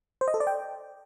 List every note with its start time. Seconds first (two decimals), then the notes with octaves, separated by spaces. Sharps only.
0.21 C5
0.28 D#5
0.34 A4
0.40 D5
0.47 G5